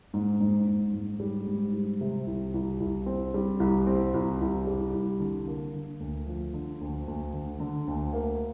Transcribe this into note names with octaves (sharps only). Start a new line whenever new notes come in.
G#2
G#2
G#2
G#2
G3
G#2
G3
C3
C2
C2
C2
C4
G3
C2
C4
C2
C2
G3
C2
D3
A#3
D3
D2
F3
D3
D2
D2
D3
D3
D2
A#3